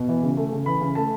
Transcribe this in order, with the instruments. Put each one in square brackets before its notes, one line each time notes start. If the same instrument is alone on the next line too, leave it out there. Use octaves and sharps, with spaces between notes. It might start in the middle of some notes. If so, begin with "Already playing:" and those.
Already playing: [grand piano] B2
E3
C#3
A3
C#3
E3 B5
C#3
A3 A5